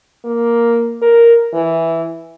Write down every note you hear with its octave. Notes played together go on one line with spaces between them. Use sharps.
A#3
A#4
E3